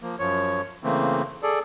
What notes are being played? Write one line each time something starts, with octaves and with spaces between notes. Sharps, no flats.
F3 A#3
F#2 F3 C#5
C#3 E3 A3 A#3 C4
G#4 A4 D5